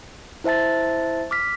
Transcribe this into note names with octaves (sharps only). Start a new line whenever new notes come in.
E4 C5 E5 A5 A6
D6 F6 B6